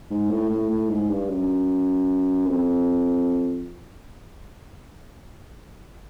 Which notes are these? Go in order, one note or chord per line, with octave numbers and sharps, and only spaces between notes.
G#2
A2
A2
A2
G#2
G2
F#2
F2